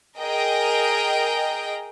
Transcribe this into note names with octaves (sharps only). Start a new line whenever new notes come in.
G#4 A#4 D#5 G5